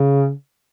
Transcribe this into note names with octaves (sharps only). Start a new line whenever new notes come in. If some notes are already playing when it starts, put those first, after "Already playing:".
Already playing: C#3